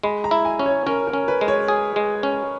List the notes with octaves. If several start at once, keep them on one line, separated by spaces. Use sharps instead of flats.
G#3 B5
A#5
E4
G#5
C#4
C#5
C#4 A#4
A#4
C#4
B4
G#3
C#5
G#4
G#3
C#4